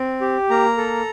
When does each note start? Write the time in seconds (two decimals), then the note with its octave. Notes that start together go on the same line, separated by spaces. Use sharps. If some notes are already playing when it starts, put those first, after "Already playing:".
Already playing: C4
0.21 G4
0.50 A#3 A#5
0.78 A4